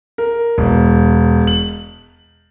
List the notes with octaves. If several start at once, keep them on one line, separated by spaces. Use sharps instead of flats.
A#4
E1
F#7